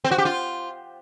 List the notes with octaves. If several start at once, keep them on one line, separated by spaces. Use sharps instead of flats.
C4
F#4
G4
F4